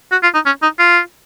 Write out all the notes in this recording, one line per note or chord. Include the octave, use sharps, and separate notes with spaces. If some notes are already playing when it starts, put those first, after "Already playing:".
F#4
F4
D#4
C#4
D#4
F4